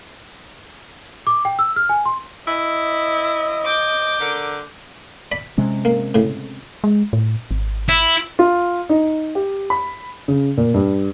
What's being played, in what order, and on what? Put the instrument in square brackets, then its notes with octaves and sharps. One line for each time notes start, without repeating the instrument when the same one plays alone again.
[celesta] D6
G5
E6
F6
G#5
C6
[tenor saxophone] E4 [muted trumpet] D#5
[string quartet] D6 G6
[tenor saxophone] D3 [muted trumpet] A#4
[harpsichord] D5 B5
[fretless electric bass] C3 G#3 C#4
[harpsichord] A#3
A2 C#3
[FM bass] G#3
A2
G#1
[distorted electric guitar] E4
[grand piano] F4
D#4
G4
B5
C#3
A#2
G2